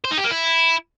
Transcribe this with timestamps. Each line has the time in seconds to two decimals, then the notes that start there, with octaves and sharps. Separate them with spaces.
0.04 C5
0.11 D#4
0.18 G4
0.24 A#3
0.31 E4